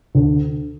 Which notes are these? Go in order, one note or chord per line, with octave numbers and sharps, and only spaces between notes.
D2